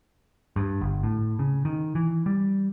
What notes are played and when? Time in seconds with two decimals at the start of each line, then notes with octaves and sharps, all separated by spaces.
0.56 G2
0.81 G1
1.03 A2
1.39 C#3
1.65 D#3
1.95 E3
2.26 G3